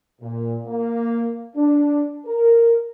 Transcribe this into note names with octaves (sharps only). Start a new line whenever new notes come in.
A#2
A#3
D4
A#4